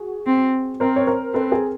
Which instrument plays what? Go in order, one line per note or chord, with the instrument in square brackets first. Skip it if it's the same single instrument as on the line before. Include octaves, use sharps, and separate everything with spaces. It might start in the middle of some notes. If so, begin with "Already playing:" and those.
Already playing: [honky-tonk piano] F#4 G#4
[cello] C4
[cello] C4 [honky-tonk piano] A#4 C5
[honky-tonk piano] C#5
A#4 C5
[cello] C4 [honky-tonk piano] A4 B4
[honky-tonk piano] G#4 A#4